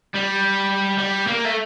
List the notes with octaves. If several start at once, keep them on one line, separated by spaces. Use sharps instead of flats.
G3
G3
A#3
A3